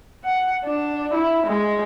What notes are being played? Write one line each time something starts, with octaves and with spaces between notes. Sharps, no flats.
F#5
D4
E4
G#3